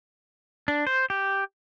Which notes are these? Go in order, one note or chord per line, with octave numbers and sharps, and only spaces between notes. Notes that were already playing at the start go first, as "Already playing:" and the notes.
D4
C5
G4